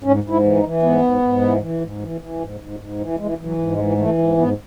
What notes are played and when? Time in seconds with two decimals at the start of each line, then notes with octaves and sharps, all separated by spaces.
0.03 G#2 C#4
0.24 G#2
0.30 E4
0.43 E3
0.57 D#4
0.63 E3
0.82 G#2 B3
1.02 G#2
1.22 G#2
1.41 E3
1.61 E3
1.81 G#2
2.01 E3
2.21 E3
2.40 G#2
2.60 G#2
2.80 G#2
2.99 E3
3.19 E3 G#3
3.38 E3
3.45 F#3
3.59 G#2
3.72 G#3
3.78 E3
3.98 E3 A3
4.18 G#2
4.37 G#2 B3